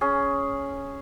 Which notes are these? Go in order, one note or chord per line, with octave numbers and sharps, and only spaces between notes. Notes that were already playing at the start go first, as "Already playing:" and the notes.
C#4 G#4